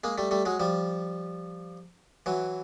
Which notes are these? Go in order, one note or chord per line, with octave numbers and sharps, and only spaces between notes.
G#3 A#3
G3 A3
G3 A3
F#3 G#3
F3 G3
E3 F#3